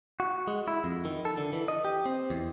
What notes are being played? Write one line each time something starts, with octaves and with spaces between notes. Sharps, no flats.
F#4
G#3
E4
F2
D#3
A4
D3
E3
D#5
G4
C4
E2